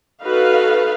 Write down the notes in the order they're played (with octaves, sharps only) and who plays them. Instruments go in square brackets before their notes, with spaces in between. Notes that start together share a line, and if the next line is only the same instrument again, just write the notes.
[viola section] D#4 F#4 A4 B4 F5